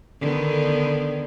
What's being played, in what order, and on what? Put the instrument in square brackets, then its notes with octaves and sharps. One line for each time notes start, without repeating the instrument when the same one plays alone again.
[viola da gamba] D3 D#3 B3